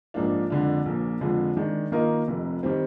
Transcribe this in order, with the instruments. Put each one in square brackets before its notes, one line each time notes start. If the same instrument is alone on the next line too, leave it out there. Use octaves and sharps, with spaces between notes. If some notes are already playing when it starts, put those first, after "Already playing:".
[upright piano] A#1 G#2 F3 A#3 D4
F2 D3 G#3 D4
A#1 A#2 F3 A#3
F2 D3 F3 G#3
D#3 G#3 D4
D#3 A#3 F4 A#4 D#5
F1 F2 C3
D#3 G3 C4